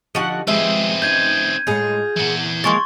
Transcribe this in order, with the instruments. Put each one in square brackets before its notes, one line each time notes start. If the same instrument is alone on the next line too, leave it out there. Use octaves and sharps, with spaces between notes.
[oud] D3 D#4 G4 [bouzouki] F3 F#4 F#5
[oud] F3 G3 G#3 [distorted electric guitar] C4 G#4 [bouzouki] B4 E5
[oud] C#4 D#4 [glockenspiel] G6 G#6 D#7
[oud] A2 G#3 C#5 [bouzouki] F4 G#4
[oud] A#2 C4 [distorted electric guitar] E3 F#5
[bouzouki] F3 G#3 A#3 [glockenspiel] C6 C#6 A6